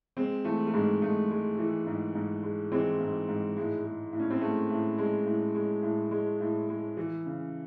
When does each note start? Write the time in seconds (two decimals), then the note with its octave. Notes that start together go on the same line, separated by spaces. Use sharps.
0.17 G#3 C4
0.45 E3 A3
0.67 A3
0.73 G#2 G#3
1.02 G#2 A3
1.30 G#3
1.58 E3
1.87 G#2
2.15 G#2
2.43 G#3
2.72 E3 G#3 C4
3.01 G#2
3.29 G#2
3.57 A2 G#3
3.84 G#3
4.13 A2
4.20 C#4
4.30 C4
4.41 G#3 A3
4.70 A2
4.98 G#3
5.26 A2
5.55 G#3
5.83 A2
6.11 G#3
6.40 A2
6.69 G#3
6.97 E3
7.26 C#3